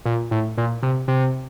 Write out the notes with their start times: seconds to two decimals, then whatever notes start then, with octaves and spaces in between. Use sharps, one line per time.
0.05 A#2
0.31 A2
0.58 A#2
0.83 C3
1.08 C3